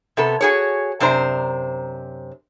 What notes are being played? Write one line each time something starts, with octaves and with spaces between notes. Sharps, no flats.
C3 B3 A4
F#4 G#4 C#5
F#2 C3 D4 C5 A#5